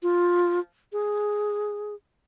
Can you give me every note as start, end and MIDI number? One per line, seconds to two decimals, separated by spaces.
0.03 0.60 65
0.93 1.95 68